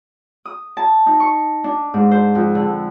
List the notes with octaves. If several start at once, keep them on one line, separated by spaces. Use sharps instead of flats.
D#6
A5
D#4
C#6
D4
G#2
C5
F2
D3